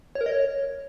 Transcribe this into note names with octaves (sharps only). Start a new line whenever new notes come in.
C#5
A#4
D#5
C#5